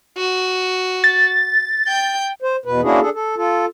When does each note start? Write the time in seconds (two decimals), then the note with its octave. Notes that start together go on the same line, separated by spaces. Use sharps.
0.17 F#4
1.04 A6
1.88 G5 G6
2.42 C5
2.65 E2 B2 B4
2.82 A#3 C#4 D4 E4 F#4 G#4
3.01 D4 G#4 A4
3.14 A4
3.36 F4 A4